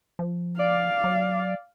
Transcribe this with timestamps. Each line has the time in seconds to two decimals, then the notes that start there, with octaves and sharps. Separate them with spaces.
0.19 F3
0.59 D5 F5
1.04 F#3